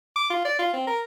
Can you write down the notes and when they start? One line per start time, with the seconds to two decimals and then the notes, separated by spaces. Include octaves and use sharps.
0.16 D6
0.30 F4
0.45 D5
0.59 F4
0.74 C4
0.88 A#4